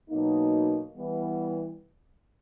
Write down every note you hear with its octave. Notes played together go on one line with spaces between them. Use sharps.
B2 F#3 A#3 D#4
E3 G3 B3